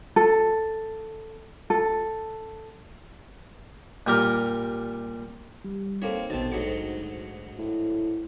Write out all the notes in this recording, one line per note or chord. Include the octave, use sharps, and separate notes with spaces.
A4
A4
A#2 G3 A#4
G3
A#3 C4 D#4 A4 C#5
A#1 B2 D#3 C4 A4 A6
D2 G#2 F#3 C#7
A2